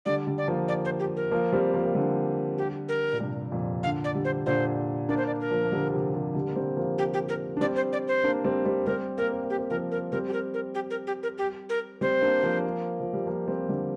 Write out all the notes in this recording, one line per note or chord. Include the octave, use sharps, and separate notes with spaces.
D3 G3 D5
D3 G3
D5
F3 A#3
D5
C5
G4
A#4
F3 A#3
G3 C4
F3 A#3
A#3
D3 G3
G4
A#4
A#2
G2 C3
F2 A#2
A#2 D3 F5
D5
D3 G3
C5
A#2 D3 C5
A#3 D4 D5
C5
D5
A#4
F3 A#3
A#3
D3 G3
C3 F3
C3 F3
D3 G3
A#3
G3 C4
F3 A#3
G4
G4
A#4
D4
G3 C4 D5
C5
D5
C5
A#3 D4
G3 C4
G3 C4
G3 C4 A#4
A#3 A#4
C4
A#3
G4
C4
F3 A#3 A#4
A#4
G3 C4 A#4
G4
A#4
A#4
G4
A#4
G4
A#4
G4
A#4
G3 C4 C5
A#3 D4
F3 A#3
F3
G3
F3 A#3
G3 C4
D3 G3